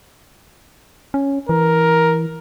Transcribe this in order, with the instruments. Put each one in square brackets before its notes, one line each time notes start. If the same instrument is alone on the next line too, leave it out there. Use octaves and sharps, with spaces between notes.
[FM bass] C#4
[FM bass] E3 [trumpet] A#4